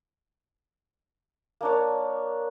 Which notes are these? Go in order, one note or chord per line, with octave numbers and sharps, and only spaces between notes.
A#3 D4 C#5